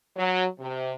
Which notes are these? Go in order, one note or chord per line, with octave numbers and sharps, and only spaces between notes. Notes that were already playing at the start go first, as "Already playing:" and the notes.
F#3
C3